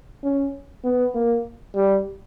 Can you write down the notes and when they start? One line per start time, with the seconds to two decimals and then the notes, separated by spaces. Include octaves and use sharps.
0.24 C#4
0.84 B3
1.14 A#3
1.75 G3